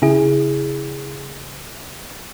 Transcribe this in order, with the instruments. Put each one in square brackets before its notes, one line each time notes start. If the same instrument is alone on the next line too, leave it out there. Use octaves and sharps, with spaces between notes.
[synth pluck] C#3 E4 G#4